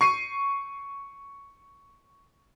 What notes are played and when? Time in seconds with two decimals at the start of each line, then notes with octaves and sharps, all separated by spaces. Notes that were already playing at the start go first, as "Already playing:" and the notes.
0.01 C#6 C7 D#7